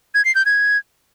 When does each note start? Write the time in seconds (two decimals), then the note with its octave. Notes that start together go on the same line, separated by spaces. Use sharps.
0.15 G#6
0.25 C7
0.35 G6
0.46 G#6